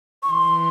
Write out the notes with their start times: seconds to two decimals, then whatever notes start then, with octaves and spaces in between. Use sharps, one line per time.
0.23 C#6
0.30 E3 C6